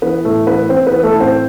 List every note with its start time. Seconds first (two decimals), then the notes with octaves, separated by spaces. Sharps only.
0.02 E3 B3 B4
0.25 A2 A3 A4
0.47 E3 B3 B4
0.69 E3 C4 C5
0.87 B3 B4
0.93 E3
1.03 A3 A4
1.15 A2
1.20 C4 C5